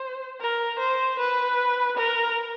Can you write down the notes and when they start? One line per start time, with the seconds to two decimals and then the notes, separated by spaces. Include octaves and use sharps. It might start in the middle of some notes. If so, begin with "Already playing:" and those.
Already playing: C5
0.40 A#4
0.80 C5
1.19 B4
1.97 A#4